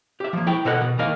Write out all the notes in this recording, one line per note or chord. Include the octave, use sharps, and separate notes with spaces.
G4 E5
F3 A#3
E4 E5 G5
B2 A4 A#4 D#5 F#5
B2
D#3 A#3 A#4 D#5 F5